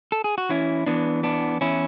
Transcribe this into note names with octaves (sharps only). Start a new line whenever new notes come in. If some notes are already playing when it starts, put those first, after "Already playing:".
A4
G#4
F#4
E3 C#4 E4
E3 B3 D4
E2 B3 D4
E2 C#4 E4